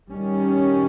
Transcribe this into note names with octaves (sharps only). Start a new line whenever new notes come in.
D#3 G3 C#4